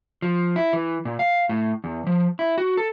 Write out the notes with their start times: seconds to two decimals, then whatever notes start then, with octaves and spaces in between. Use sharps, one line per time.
0.22 F3
0.56 E4
0.73 E3
1.05 A#2
1.19 F5
1.49 A2
1.84 E2
2.07 F3
2.39 E4
2.58 F#4
2.77 A4